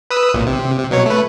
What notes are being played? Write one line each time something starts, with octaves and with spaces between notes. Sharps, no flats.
B4 D#6 E6
B1 A#2
C3
C3
B2 F#3 C#5
A3 B4